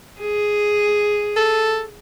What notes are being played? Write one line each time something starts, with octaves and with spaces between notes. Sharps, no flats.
G#4
A4